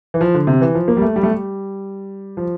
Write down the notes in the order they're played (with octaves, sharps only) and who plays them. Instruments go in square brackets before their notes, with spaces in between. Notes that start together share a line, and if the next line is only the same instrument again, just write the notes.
[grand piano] E3
F3
D3
C3
E3
F3
A#3
G3
A3
G3
A3
G3
F3